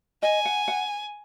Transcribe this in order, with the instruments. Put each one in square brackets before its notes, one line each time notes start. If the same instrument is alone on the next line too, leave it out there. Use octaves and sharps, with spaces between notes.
[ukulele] D#5 [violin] G#5
[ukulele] F#5
F#5